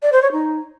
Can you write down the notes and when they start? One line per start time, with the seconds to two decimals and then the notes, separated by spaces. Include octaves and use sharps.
0.02 D5
0.12 C5
0.22 C#5
0.32 D#4